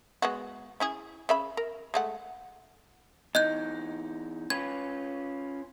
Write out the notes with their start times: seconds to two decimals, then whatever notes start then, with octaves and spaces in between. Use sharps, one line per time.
0.22 G#3 B3 F#4
0.80 C#4 E4 G#4
1.29 C#3 E5 B5
1.57 A#4
1.94 G#3 A3 F#5
3.35 E2 D#4 D#5 F#6 G6
4.50 C#4 F4 B4 G#6